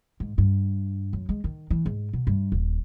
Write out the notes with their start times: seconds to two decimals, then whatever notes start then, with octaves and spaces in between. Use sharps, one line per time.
0.20 G#2
0.38 G2
1.13 F#2
1.29 G#3
1.44 D#3
1.70 E3
1.86 G#2
2.13 B2
2.27 G2
2.52 D#1